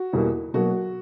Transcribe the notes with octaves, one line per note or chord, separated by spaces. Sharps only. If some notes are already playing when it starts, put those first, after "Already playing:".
Already playing: F#4
E2 B2 G3 A#3
B2 F#3 A#3 F#4